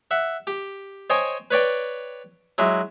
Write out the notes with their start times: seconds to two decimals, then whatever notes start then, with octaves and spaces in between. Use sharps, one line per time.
0.11 E5 F#5
0.47 G4
1.10 C5 C#5 D#5 G5 G#5
1.51 B4 C#5 D5 G5
2.58 F#3 G#3 E4